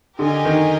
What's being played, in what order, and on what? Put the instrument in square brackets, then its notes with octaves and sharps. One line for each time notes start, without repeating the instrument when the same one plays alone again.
[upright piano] D3 [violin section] G4 A#4 D#5 G#5
[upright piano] D#3